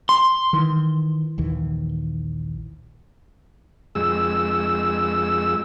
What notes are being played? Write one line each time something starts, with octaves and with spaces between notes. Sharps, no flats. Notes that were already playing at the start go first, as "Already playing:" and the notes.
C6
D#3 E3
A#1 D#2 E3
F2 G#3 E6